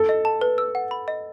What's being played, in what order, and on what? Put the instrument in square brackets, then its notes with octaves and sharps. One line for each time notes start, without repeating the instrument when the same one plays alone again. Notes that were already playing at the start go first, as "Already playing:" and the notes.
Already playing: [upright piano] A4
[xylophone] D#5
A5
B4
E6
F#5
B5
D#5